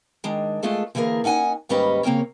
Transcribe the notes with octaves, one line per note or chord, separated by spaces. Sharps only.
D#3 G#3 D4
G#3 A3 F4 G#4 A4
D3 E3 A#3 G#4 A#4
C#4 D#4 F#5 G#5
D#2 G#2 G3 C#4 B4 D#5
C#3 A#3 C4 A#4 C#5